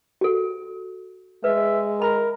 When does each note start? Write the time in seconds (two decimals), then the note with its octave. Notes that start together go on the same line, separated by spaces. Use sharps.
0.21 F#4 A4
1.44 G#3 B4 E5
2.02 A#4 B5